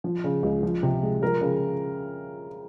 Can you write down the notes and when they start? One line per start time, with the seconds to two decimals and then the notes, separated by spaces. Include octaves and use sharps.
0.04 F3
0.24 C#3
0.43 C#2
0.63 F3
0.83 C3
1.03 G#3
1.22 F3 A#4
1.41 C#3